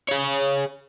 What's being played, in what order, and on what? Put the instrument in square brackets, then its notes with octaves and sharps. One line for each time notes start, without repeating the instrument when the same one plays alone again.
[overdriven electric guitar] G#4 C#5